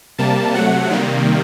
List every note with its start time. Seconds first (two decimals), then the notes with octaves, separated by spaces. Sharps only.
0.18 C3 G3 A#3 A5
0.54 C3 F#3 A3 F#5
0.90 C3 D#3 G3 A#3